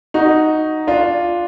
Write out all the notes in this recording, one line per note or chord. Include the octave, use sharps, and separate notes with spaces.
D#4 F#4
D4 F4